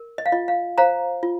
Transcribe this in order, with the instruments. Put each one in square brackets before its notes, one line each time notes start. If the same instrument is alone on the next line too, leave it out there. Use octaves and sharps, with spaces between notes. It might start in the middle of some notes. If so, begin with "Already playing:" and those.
Already playing: [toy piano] A#4
D#5
F5
F4 D#5
F5
C5 F5 A#5
F4